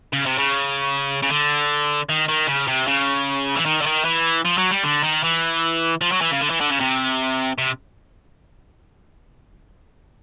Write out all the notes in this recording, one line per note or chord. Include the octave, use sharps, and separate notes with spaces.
C#3
C3
C#3
C#3
D3
D#3
D#3
C#3
C3
C#3
E3
D#3
D3
D#3
E3
F3
F#3
G3
D3
D#3
E3
F3
F#3
E3
C#3
D3
E3
D3
C#3
C3
C3